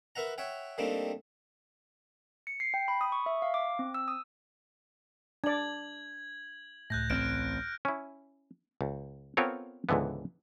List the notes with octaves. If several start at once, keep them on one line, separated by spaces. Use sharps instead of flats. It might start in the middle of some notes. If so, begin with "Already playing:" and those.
A#4 B4 E5 F#5 A#5
C#5 E5 F#5 G5
G3 A3 A#3 C4 D4 D#4
C#7
C7
G5
B5
D#6
C#6
E5
F5
D6
C4
E6
D#6
D4 D5 G#6 F#7
C#2 A2 F#6 G6 A#6
A1 C4 F6 D7
C#4 E4
C#2
B3 C4 F4 A4 A#4 C#5
C#2 G#2 D3 E3 B3